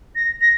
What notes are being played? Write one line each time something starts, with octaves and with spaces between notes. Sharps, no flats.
A#6
A#6